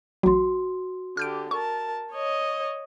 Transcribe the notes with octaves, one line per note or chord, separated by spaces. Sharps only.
A1 F#3 F#4 C6
D3 G4 F6 G6 D7
A#4 A5 C#6
C#5 D#5